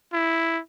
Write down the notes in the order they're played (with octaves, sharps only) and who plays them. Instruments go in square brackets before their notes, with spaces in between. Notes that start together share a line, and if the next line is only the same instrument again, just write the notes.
[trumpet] E4